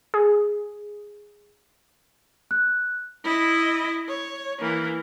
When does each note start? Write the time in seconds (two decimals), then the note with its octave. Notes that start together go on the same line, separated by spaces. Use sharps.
0.14 G#4
2.51 F#6
3.24 E4 D#5
4.08 C#5
4.60 E3 A#3